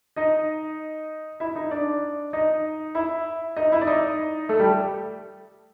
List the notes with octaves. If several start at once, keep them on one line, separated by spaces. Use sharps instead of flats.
D#4 D#5
E4 E5
D#4 D#5
D4 D5
D#4 D#5
E4 E5
D#4 D#5
E4 E5
D5
D#4 D#5
A3 A4
G3 G4